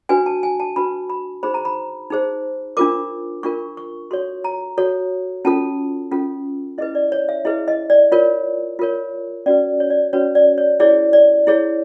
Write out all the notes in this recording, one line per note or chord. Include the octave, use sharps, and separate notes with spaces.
D4 F#4 B4 G#5
A5
G#5
A5
D4 F#4 B4 B5
B5
D#4 G#4 C5 B5
A#5
B5
D#4 G#4 C5
D4 F4 A#4 D6
D4 F4 A#4 C#6
C#6
F#4 A4 C#5 C6
A#5
F#4 A4 C#5
C#4 F4 A4 A5
C#4 F4 A4
E4 G#4 B4 D#5
D5
C#5
E5
E4 G#4 B4 D#5
D#5
D5
F4 A#4 C#5
F4 A#4 C#5
C#4 F#4 B4 D5
C#5
D5
C#4 F#4 B4 C#5
D5
C#5
E4 G#4 C#5 D5
D5
E4 G#4 C#5